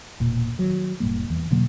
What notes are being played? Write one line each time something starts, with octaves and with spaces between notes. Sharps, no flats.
E1 A#2 A#3
D#3 F#3
F1 A2 G3 A#3
E2 E3
B2 D3 F#3 A#3